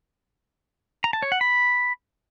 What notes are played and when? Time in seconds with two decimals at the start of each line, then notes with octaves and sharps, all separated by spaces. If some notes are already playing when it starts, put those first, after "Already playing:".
1.04 A#5
1.13 A5
1.22 C#5
1.32 F#5
1.41 B5